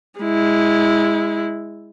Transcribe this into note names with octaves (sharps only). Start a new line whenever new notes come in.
G#3 E4